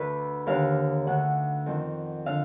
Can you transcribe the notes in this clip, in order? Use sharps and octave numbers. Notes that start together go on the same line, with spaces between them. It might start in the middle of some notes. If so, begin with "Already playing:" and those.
Already playing: D2 D3 B4
D#2 D3 F5
D2 D3 F#5
F2 D#3
D3 F5